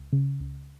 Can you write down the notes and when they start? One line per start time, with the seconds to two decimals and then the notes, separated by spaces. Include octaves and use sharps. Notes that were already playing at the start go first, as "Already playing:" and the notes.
Already playing: C#2
0.13 C#3
0.40 C#2